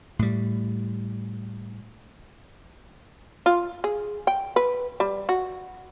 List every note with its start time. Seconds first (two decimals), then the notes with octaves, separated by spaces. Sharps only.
0.19 A2 G3
3.46 F4
3.84 G#4
4.27 G5
4.56 B4
5.00 G3
5.29 F#4